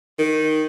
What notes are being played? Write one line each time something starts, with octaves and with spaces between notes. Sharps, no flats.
D#3